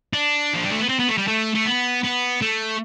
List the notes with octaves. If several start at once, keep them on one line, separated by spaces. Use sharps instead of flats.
D4
F3
G3
A3
B3
C4
B3
A3
G3
A3
A3
B3
B3
A3